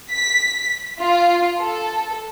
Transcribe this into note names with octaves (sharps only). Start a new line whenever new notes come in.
B6
F4
A4